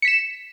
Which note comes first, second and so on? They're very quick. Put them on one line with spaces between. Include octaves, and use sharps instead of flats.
C#7 B6 E7